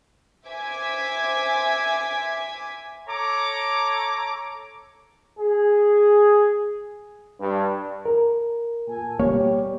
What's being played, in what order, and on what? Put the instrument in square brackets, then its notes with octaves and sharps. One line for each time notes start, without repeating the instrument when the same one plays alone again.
[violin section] C5 E5 G#5 D6 G#6 B6
[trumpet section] A4 C#5 A#5 D6
[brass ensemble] G#4
G2
[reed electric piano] A#4
[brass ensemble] A#2 A4 G#5
[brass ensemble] B2 G3 G4 [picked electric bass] A#3 [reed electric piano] C#5